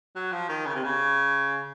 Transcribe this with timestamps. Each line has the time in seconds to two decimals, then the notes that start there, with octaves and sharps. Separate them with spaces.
0.16 F#3
0.32 F3
0.49 D#3
0.66 C#3
0.75 C3
0.84 C#3